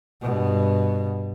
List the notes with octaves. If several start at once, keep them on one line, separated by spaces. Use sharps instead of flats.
G2 B2